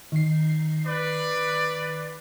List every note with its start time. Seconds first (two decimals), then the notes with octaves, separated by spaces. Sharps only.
0.12 D#3 C7
0.87 B4 D5